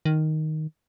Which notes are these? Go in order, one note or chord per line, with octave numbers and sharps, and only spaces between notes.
D#3